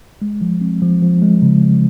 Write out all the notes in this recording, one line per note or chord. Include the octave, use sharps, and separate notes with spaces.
G#3
F3
C4
F3
F3
G#3
C#3
G#3